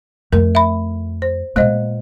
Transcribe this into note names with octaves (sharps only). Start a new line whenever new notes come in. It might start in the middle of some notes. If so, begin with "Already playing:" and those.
F2 A3 A#4
E5 B5
C5
A#2 G#3 B3 C5 D#5